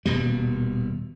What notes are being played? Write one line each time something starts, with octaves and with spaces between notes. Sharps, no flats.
D#1 B2 G3